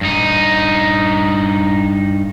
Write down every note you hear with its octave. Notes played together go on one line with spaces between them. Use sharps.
G2 D#4